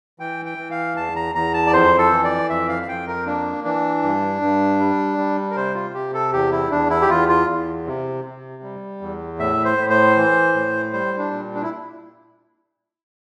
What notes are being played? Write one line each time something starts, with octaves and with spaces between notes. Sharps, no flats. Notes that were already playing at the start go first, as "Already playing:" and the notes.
E3 G5
G5
E3
F5
E2 A5
A#5
E2 A#5
A5
D5
F2 C5
A4
E3
D5
F2 E5
F5
F5
F2 G5
A#4
A#3 D4
E3 D4
G2
G2
G3
G3
A#4
C3 C5
F4
C3 G4
A4
E2 G4
E4
E2 D4
E4
G4
E2 F4
F4
E2
C3
C3
G3
E2
A2 E5
C5
A2
C5
E3
A2
G3 C5
D4
A#2
D4
E4